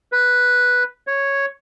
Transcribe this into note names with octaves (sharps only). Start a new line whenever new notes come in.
B4
C#5